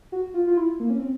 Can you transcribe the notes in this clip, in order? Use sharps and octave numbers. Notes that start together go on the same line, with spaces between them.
F#4
F4
F4
E4
A#3
C#4
C4